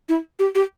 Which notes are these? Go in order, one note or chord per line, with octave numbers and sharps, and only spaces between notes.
E4
G4
G4